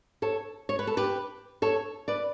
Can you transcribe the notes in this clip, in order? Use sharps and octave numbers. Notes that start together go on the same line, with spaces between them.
A4 C#5
C#5
B4
A4
G4 B4
A4 C#5
B4 D5